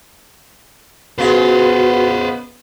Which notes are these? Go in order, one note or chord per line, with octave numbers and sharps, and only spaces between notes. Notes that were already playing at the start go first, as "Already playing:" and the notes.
C#3 G#3 B3 F4 F#4 B4 C5